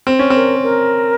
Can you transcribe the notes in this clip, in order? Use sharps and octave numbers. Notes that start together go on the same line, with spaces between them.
C4
C#4
C4 A#4
A#4